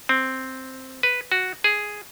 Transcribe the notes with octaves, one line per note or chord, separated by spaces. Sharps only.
C4
B4
F#4
G#4